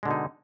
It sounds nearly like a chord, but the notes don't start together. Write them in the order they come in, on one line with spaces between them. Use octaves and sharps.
G#3 D3 B2 D#4